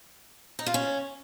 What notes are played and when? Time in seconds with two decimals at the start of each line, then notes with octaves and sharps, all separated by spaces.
0.59 D#4
0.66 F4
0.74 C#4